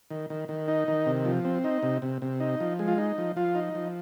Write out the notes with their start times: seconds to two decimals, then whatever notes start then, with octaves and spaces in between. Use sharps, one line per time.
0.10 D#3
0.30 D#3
0.49 D#3
0.68 D#4
0.88 D#3
1.06 C3
1.25 F3
1.45 C4
1.64 D#4
1.83 C3
2.02 C3
2.22 C3
2.40 D#4
2.60 F3
2.79 G#3
2.88 F4
2.98 D#4
3.18 F3
3.36 F3 F4
3.55 D#4
3.75 F3